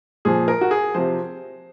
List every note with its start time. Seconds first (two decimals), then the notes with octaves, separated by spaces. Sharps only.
0.25 A#2 F3 G#4
0.48 A#4
0.61 F#4
0.71 G#4
0.95 C3 F3 C5